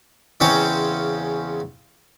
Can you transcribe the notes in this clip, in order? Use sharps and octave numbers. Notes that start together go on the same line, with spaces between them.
E2 C#3 C4 C#4 C5 D6